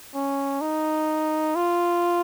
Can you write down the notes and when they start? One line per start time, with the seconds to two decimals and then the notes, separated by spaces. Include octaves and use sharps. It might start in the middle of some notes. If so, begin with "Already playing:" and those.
0.15 C#4
0.61 D#4
1.56 F4